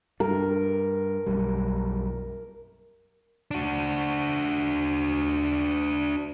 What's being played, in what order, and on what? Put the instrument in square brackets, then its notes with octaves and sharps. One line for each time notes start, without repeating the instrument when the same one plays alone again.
[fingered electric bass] G2 [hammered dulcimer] A#4
[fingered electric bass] B1 F#2 G3
[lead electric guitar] D4 F#4